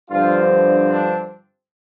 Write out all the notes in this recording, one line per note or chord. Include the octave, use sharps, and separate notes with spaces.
G2 D3 F3 C4 F4
D4